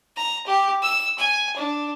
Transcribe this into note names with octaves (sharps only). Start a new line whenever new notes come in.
A#5
G4
E6
G#5
D4